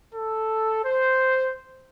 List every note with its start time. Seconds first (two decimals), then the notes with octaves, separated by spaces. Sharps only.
0.15 A4
0.85 C5